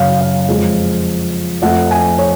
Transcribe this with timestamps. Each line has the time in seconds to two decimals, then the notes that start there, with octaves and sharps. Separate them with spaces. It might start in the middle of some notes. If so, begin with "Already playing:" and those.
Already playing: F#2 C#3 F#3 C#5 F5
0.21 F5
0.49 F2 F3 G#3
1.62 F2 F3 A3 F#5
1.91 G#5
2.19 C#5